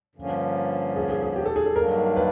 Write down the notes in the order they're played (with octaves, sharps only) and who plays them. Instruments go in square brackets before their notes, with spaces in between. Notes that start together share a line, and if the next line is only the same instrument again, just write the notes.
[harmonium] G2 D3 F3 A#3 C#4
[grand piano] G#4
G#4
G#4
G4
A4
G#4
A4
[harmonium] G2 D#3 F#3 A#3 D4 [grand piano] A#4
[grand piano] B4